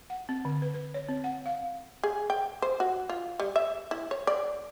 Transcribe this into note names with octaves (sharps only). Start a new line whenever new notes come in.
F#5
C4
D3
B4
B4
C#5
C4
F#5
F5
G#4
G5
C5
F#4
F4
G3
E5
E4
C#5
D5